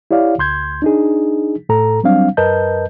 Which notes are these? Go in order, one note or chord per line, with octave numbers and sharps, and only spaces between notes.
E4 G4 C#5 D5 F5
D2 C6 G6 G#6
D4 D#4 G#4
A2 A4 A#5
F#3 G3 C4 D4 F5
F#2 A#4 B4 D#5 A5 G6